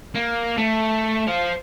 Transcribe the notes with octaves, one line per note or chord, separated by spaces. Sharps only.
A#3
A3
C5 F5